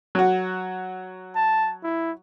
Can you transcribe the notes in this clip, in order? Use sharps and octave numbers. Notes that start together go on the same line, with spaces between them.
F#3 F#4
A5
E4